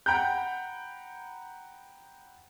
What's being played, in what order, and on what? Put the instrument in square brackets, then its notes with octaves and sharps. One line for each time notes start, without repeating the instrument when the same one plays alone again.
[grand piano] F#5 G5 A#5 B5 G6